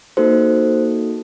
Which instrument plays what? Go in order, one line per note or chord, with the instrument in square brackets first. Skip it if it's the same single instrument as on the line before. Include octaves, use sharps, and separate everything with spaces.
[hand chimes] A#3 D#4 F#4 A4 C5